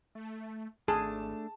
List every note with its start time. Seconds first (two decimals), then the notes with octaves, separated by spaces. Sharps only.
0.15 A3
0.88 G#1 A3 D4 G#4 A5